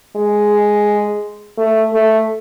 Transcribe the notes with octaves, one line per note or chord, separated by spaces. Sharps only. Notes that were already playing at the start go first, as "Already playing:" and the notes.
G#3
A3
A3